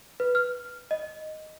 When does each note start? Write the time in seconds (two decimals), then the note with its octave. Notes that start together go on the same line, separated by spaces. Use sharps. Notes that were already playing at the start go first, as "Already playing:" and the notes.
0.20 B4
0.35 F6
0.91 D#5